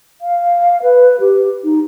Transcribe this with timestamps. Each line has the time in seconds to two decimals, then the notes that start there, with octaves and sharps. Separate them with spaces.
0.21 F5
0.82 B4
1.20 G4
1.64 D#4